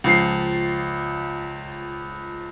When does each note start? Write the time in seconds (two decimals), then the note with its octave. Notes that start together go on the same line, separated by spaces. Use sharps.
0.04 C#2 F3 C7